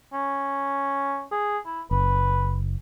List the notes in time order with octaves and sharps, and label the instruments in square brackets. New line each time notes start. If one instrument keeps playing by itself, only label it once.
[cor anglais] C#4
G#4
E4
[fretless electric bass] F#1 [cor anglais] B4